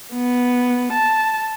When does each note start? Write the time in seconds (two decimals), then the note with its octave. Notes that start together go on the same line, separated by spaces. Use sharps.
0.14 B3
0.93 A5